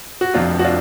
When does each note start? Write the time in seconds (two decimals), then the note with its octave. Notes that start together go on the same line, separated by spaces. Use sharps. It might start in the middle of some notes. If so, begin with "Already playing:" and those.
0.21 F#4
0.34 F1 F2 F3 D4 F4
0.59 F#4
0.64 D4 F4